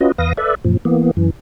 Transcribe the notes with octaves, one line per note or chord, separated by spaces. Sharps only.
C#4 F4 F#4 B4 D#5
E2 B4 F5 D#6 A#6
A4 B4 D5 E5
F#2 A#2 F3
E3 A#3 B3
F#2 E3